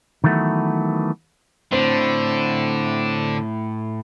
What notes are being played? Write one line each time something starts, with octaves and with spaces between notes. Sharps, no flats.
D#3 E3 F#3 A3 B3
A2 D3 C4